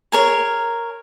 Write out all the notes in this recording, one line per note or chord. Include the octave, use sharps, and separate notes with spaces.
G#4 A#4 C#5